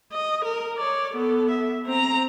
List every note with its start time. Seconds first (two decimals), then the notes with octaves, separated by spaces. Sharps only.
0.13 D#5
0.45 A#4
0.77 C#5 D5
1.14 B3 A4
1.51 E5
1.86 C4 A#5